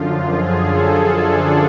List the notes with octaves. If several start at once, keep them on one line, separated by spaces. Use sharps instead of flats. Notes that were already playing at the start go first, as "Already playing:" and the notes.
Already playing: F#2 D3 F3 F4
G#4
A4
D4